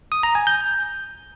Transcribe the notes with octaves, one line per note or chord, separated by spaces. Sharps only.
D#6
A#5
G#5
G6